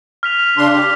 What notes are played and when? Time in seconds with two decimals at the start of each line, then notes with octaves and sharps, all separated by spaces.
0.23 F6 B6 F7
0.57 C#3 D4 C6
0.72 G4